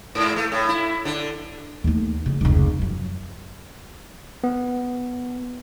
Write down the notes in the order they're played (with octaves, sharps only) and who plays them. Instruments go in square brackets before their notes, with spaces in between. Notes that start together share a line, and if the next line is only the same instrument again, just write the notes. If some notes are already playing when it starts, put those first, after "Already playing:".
[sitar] G#2
A3
A2
E4
D3
[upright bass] D#2 A3
C#3 F3
F1 C#2
F#2 F3
[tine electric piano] B3